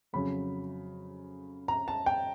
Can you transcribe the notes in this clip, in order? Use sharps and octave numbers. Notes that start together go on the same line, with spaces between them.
F2 C#3 F#3 B5
A#5
A5
G5